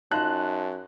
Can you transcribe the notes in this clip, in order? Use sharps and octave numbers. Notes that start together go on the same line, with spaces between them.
F#2 D#4 F4 A5 C6 F#6